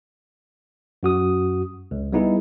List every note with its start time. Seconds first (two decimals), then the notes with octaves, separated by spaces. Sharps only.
1.03 F#2 F#4 D#6
1.91 C#2
2.13 G3 B3 D#4 E4 G#4